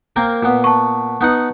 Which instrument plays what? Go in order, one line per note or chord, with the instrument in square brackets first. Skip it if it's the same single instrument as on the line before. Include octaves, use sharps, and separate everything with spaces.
[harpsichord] A#3 C4 A#4
A#2 B3
[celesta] A5 C#6
[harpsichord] B3 D#4 F#5